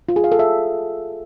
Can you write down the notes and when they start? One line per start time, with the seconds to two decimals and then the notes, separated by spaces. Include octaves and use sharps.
0.09 F4
0.16 G#4
0.24 F5
0.32 A4
0.39 E5